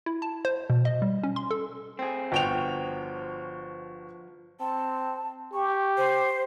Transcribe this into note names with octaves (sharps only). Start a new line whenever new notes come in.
E4
A5
C5
B2
D#5
G3
C#4
C6
A4
C4 G#4
G1 F3 F#4 G5 F7
C4 A5
G4 C#6
C5